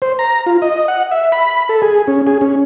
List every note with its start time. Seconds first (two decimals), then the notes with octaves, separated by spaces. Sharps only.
0.02 C5
0.19 A#5
0.46 F4
0.62 D#5
0.88 F#5
1.11 E5
1.32 B5
1.69 A4
1.82 G#4
2.07 C#4
2.27 G#4
2.41 C#4